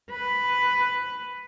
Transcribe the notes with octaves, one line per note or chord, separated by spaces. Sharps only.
B4